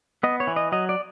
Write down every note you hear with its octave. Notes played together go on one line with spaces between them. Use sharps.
B3 D#5
C#5
E3
D#5
F#3 D#5
D5